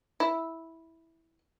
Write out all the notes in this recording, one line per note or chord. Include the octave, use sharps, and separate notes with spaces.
E4